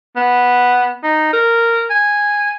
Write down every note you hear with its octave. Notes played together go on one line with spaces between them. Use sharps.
B3
D#4
A#4
G#5